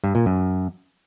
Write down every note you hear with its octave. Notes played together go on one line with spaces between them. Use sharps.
G2
A#2
F#2